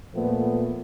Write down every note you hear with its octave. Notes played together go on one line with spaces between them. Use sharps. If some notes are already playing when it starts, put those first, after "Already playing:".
A#2 F3 A3 B3